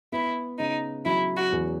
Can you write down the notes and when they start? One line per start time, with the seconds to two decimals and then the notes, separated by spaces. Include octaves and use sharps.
0.12 B3 E4
0.59 C#3 D#4
1.05 F#3 E4
1.37 F#4
1.52 E2